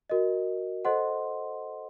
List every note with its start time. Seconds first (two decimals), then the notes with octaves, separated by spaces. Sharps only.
0.10 F#4 A#4 D#5
0.85 A4 C5 D#5 F#5 C6